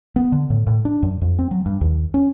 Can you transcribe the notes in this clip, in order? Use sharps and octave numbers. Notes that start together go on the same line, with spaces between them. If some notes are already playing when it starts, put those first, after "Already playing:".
B3
D3
A2
A2
D4
F#2
F2
C4
F#3
G2
D#2
C#4